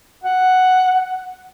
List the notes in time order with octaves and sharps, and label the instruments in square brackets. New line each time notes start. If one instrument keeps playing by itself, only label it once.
[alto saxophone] F#5